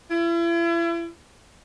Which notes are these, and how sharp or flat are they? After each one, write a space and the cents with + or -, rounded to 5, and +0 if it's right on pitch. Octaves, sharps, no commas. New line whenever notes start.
E4 +40